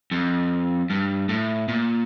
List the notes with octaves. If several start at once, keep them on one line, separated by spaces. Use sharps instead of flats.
F2
G2
A2
A#2